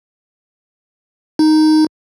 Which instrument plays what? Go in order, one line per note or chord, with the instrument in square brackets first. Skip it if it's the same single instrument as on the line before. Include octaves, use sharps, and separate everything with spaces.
[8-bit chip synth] D#4